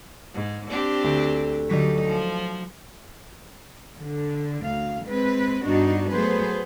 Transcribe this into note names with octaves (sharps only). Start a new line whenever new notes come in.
G#2
C4 D4 G4
D2
D3 F#3 G3 D#4 B6
F3 C#7
D3
D2 F5
G#3 C4 B4
G2 B3 D4 D#4 F#4
F#3 A3 B3 G#4 B4 C5